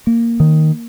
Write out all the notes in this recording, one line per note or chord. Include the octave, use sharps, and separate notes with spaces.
A#3
D#3